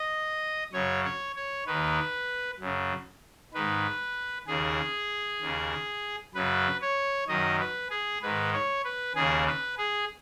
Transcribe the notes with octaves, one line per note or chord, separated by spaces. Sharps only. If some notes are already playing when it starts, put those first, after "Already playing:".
Already playing: D#5
F#2 C#3 C#5
C#5
C#5
D#2 D#3 B4
F#2 C#3
G#2 D#3 B4
D#2 C#3 G#4
D#2 C#3
F#2 C#3 B4
C#5
F#2 D#3 D#5
B4
G#4
G#2 D#3 B4
C#5
B4
D#2 C#3 G#4
B4
G#4